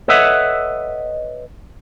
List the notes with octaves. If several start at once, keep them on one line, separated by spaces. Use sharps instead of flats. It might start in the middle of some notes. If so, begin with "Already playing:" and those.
A4 B4 C#5 D#5 E5 F#5